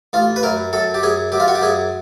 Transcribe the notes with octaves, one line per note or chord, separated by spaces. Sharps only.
A1 F4
B4
F#2 A#4
F#2 A4
G4
F#2 G#4
F#2 G4
F4
F#4
G4
F#2 G#4